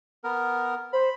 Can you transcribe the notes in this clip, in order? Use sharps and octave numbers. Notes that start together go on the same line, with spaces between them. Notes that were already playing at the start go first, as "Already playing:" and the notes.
B3 A#4
C5 B5